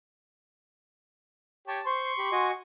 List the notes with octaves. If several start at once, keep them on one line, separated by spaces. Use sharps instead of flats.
G4 C#5 A5
C5 C6 C#6
G4 B5
F#4 D#5 G#5